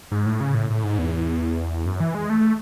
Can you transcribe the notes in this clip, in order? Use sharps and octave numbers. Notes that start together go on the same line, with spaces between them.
G#2
A2
C#3
A2
A2
G#2
E2
F#2
E3
G#3
A3